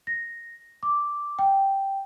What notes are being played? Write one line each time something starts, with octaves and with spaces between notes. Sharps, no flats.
A#6
D6
G5